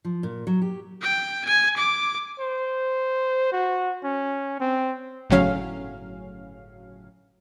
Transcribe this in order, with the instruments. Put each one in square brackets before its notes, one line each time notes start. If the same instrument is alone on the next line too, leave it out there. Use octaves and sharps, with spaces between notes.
[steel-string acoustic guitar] F3
A#2
F#3
G4
[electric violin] G5
G#5
D6
[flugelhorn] C5
F#4
C#4
C4
[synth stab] G1 A2 C#3 F#3 C#4 F5